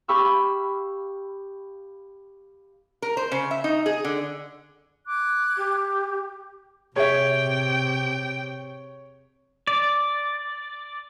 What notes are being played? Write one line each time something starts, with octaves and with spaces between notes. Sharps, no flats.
G4 F5 B5 C#6 E6
A#4
C5
C#3
E5
D#4
G#4
D3
D6 F#6 G#6
G4
C3 G#4 C#5 E5 G5
D5